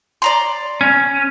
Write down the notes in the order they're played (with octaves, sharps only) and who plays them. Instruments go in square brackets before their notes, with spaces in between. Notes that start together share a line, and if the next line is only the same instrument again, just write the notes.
[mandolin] D5 A#5 C6
[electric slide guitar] C#4